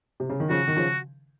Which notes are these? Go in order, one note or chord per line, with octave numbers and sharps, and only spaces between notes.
C3
C#3
D#3
C#3 F3 F#4
D#3
C#3 F3